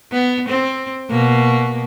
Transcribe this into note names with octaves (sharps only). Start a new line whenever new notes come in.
B3
C4
B2 A#3